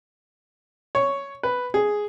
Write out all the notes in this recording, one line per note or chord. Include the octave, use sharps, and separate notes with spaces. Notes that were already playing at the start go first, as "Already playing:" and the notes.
C#5
B4
G#4